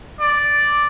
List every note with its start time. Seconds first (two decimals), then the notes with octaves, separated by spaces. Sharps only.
0.20 D5